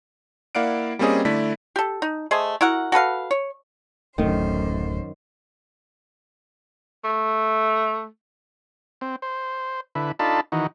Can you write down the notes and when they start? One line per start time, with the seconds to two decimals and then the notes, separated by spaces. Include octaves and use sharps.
0.55 A#3 E4 D5 F5 F#5 D7
0.99 G3 A#3 C4 C#4 G#4 D#5
1.25 D3 A3 E4 D5 B6
1.76 G4 A4
2.02 D#4
2.31 A3 G#4 C5 D#5
2.61 E4 F#4 A#4 F#5
2.92 F#4 A4 B4 F5
3.31 C#5
4.18 D1 F#2 D#3 A3 C5
7.04 A3
9.01 C4
9.22 C5
9.95 D3 E4 B4
10.19 D4 D#4 F4 A4 A5 B5
10.52 D#3 E3 D#4 F#4